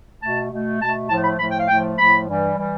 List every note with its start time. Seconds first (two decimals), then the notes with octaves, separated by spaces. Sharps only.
0.21 B2 A3 A5
0.51 B2 A3
0.80 B2 A3 A5
1.09 A2 F3 A3 A5
1.24 B5
1.39 A2 F3 A3 B5
1.49 G5
1.59 F5
1.68 A2 F3 A3 G5
1.98 A2 F3 A3 B5
2.28 G2 E3 G3
2.58 E3 G3